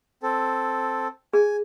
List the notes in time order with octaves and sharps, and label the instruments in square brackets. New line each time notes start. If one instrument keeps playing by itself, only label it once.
[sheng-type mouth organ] C4 A4
[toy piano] G#4 [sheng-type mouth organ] G#5